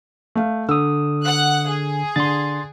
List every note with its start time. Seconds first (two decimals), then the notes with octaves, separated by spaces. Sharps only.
0.35 A3 F5
0.69 D3 D#6 E6
1.24 F#5 F#6
1.70 G#4
2.16 D3 C6 A6